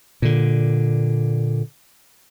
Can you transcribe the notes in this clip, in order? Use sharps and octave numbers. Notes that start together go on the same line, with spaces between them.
A#2 D3